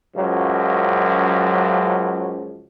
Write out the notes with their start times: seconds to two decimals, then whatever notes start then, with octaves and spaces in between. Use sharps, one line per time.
0.16 C#2 F#2 F3 F#3